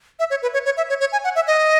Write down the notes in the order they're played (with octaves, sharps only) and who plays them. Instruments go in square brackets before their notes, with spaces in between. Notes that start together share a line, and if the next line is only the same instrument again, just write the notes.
[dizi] E5
C#5
B4
C#5
C#5
E5
C#5
C#5
G#5
F#5
E5
D#5